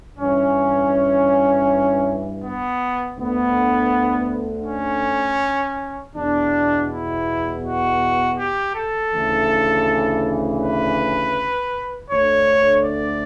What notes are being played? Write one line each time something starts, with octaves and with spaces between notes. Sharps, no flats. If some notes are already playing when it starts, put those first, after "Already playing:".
G2 E3 C#4
B3
D2 D3 B3
C#4
E2 B2 D4
E4
F#4
G4
A4
D2 C#3 E3
B4
D2 D3 C#5
D5